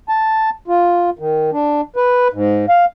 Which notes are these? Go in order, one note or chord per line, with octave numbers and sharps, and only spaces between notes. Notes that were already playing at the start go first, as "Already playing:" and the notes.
A5
F4
D#3
D4
B4
G#2
F5